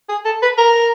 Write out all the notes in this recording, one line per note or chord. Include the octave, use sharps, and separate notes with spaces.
G#4
A4
B4
A#4